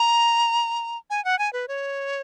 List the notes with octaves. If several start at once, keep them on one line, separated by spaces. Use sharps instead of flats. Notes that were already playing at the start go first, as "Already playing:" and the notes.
Already playing: A#5
G#5
F#5
G#5
B4
C#5